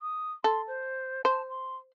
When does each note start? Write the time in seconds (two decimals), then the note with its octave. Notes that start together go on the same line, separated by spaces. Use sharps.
0.02 D#6
0.44 A4 C6
0.68 C5
1.25 C5 A5
1.49 C6